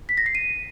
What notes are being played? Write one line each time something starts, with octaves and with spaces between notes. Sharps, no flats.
B6
A#6
C7
D#7